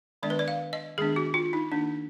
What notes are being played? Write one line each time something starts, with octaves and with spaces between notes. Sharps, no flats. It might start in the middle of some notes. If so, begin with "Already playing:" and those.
D#3 G#3 B3 D4 D5
B4
D5
F5
D#5
D#3 G#3 B3 D4 G#4
F#4
F4
D#4
D#3 A#3 D4